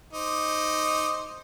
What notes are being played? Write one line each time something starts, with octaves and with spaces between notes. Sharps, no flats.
D#4 C5 D6